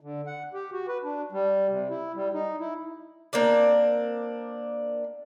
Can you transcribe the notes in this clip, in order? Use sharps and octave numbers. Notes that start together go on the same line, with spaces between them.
D3
F#5
G4
F#4
B4
D4
G3
C3
E4
G3
D#4
E4
A#3 C4 D4 D5